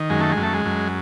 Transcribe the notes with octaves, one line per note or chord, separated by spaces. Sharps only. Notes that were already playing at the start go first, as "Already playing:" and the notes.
Already playing: D#3
F#2 G#3
A3
G#3
F#2
A3
G#3
F#2